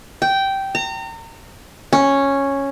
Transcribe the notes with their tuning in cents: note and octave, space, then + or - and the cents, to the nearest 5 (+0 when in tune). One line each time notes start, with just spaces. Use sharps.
G5 -10
A#5 -35
C#4 -5